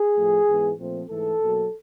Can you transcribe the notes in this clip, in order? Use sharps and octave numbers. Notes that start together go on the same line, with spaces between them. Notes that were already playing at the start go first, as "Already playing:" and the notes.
Already playing: G#4
A2 F3 A3
G#2 E3 G#3 B3
A#2 F3 A3 C4
G#2 E3 A3 A4
B2 F#3 A#3